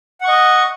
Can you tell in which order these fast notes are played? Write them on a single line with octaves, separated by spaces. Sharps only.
F#5 C#6 D#5